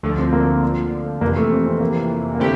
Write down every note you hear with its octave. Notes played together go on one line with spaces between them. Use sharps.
D2 D3 F3 A3
C4
A#3
F2 C3 E3 A#3
A3
C4
C4
A#3
A#3
D3 A3 C4 E4 G4